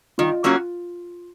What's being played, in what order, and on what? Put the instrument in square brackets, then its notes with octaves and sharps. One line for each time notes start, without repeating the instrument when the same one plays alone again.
[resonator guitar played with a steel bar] D#3 [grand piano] F4
[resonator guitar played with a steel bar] F#3 A#3 C#4 F#4